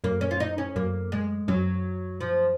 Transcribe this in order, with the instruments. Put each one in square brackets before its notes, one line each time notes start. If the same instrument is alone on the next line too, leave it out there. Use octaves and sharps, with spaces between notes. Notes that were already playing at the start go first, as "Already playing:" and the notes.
[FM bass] F#2 [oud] A#3
[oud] C#4
F4
D#4
C#4
[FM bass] F#2 [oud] A#3
[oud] G#3
[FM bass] F#2 [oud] F#3
[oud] F3